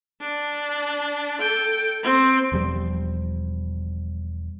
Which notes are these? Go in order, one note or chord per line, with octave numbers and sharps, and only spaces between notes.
D4
A4 G5
C4
E1 F3 G3